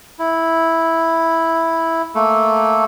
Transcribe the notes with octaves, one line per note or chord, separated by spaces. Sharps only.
E4
A3 A#3 A4